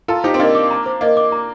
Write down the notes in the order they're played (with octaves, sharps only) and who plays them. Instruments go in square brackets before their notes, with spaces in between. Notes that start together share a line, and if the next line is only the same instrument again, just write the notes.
[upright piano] F4 A4 [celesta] A#5
[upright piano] D#4 G4 [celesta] C5
[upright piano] C4
[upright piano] A#3 D4 [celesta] D#5
[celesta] D6
A#5
C5
[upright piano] A#3 [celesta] D#5
[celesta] D6
A#5